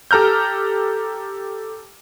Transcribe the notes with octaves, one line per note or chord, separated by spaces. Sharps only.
G4 A4 A#5 F6 G6